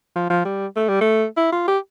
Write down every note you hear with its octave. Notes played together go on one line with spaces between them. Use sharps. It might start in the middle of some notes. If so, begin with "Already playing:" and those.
F3
F3
G3
A3
G3
A3
E4
F4
G4